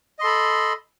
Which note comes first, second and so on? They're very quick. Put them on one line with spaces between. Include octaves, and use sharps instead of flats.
D#5 C6 A4 B5